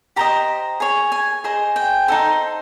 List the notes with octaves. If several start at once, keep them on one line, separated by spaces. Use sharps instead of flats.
G4 C5 D#5 A#5
G#4 C#5
G#5
G#4 C5 D#5
G5
D#4 F#4 A4 C5